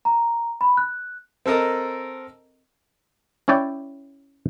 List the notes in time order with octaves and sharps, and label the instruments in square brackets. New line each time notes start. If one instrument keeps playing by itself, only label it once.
[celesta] A#5
B5
F#6
[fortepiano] C4 A4 A#4 D#5 A5
[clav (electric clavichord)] C#4 E4 C#5 D5 G5